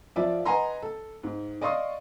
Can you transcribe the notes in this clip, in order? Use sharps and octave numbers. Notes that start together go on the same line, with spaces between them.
F3 F4 D5 E5
B4 D#5 F#5 G#5 A#5 C6
A4
G#2
D5 D#5 F5 C6 C#6 D#6